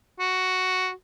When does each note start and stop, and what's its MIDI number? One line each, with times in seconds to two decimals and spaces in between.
0.20 0.90 66